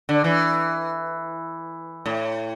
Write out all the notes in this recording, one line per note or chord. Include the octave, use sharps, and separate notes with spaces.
D3
E3
A2